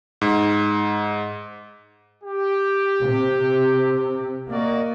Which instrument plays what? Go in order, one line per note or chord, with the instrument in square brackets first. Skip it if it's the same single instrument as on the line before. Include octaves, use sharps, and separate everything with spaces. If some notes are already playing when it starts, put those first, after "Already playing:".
[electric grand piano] G#2
[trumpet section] G4
[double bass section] C3
[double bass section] A#3 [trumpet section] F#4 D5 D#5